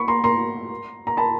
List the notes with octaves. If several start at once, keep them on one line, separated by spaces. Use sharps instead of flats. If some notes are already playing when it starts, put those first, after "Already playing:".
Already playing: B5 C#6
A#5 C6
A#5 C6
A#5
A5 B5